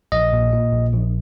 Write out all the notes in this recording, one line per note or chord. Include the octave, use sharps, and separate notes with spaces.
A#1 D#5
A#2
A#2
A#1
A#1